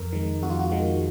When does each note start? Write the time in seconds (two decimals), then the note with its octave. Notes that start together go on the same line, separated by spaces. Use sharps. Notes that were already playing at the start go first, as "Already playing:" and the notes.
Already playing: F2 A#4
0.13 D#3 G#3
0.43 F2 F#4
0.50 F4
0.59 F#4
0.72 D#3 G#3